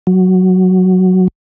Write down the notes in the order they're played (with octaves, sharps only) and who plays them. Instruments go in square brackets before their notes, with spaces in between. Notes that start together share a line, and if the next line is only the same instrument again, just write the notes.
[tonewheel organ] F#3